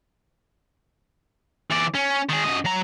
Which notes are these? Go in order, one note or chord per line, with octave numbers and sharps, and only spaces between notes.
E3 D5
C#4
D#3 G#4
F#2 D#5
F#3 A#5